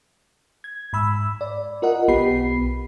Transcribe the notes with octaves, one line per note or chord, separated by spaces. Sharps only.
G#6
G#2 B5 E6
D5
F4 A#4 D#5 F#5
B1 B3 G4 B5 C7